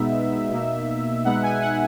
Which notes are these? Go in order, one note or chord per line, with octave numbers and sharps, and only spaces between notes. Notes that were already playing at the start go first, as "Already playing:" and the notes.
Already playing: B2 G#3 B3 D#4 E5
B2 A#3 D#4
B2 G#3 B3 D#4 F#5
G#5
F#5